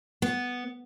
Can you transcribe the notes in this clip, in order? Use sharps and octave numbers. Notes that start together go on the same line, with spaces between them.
B3